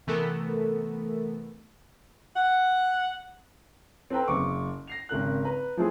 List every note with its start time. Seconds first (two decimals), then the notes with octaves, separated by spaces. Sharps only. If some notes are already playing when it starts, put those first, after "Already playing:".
0.07 C3 E3 A3 B3 A4 A#4
2.34 F#5
4.10 C4 A4 B4 G5 A#5
4.28 F#1 C#6 D6
4.88 A#6 C7 F7
5.09 G#1 C#3 A#4 F#6
5.45 B4 A#5
5.77 F3 A3 C4 E4 G#4